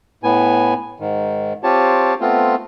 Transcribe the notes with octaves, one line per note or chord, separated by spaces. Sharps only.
A2 B3 G#5
G#2 D#3
C4 F4 G4 C#5 A5
A3 B3 C4 F4